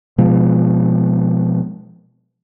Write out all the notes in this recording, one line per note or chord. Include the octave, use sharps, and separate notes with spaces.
B2 F3 G#3